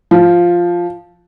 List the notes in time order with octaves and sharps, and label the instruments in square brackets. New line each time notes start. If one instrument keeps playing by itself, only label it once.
[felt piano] F3